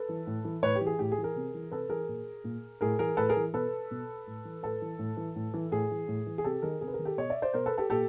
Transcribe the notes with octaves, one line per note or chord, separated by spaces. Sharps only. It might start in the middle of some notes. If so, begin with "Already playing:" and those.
Already playing: A4 B4
E3
A2
E3
A2 B4 C#5
G4
E3
G#4
A2 G4
G#4
E3
G#4 A#4
C3
E3
C3 A4 B4
E3 G#4 A#4
A#2
A#2
A2 G#4 A#4
E3 G#4 A#4
A2 A4 B4
G#4 A#4
E3
B2 A4 B4
B2
A2
E3
A2 A4 B4
E3
A2
E3
A2
E3
A2 G#4
E3
A2
E3
G#4
C3 G4 A4
D#3 G#4 A#4
C3 G#4 A#4
B4
D#3 G#4 A#4
G4 A4
B2 C#5 D#5
D5 E5
C5 D5
B2 A#4 C5
A4 B4
G4 A4
A#2 G4 A4